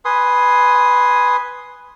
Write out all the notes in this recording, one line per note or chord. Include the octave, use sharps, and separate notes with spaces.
B4 G#5 C6 D#6